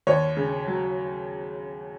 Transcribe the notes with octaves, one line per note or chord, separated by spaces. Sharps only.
D#2 C#5
C#3
F#3